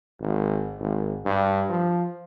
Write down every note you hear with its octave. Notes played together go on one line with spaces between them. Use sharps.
G#1
G#1
G2
F3